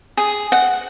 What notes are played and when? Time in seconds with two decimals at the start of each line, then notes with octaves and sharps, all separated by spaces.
0.17 G#4
0.52 F#5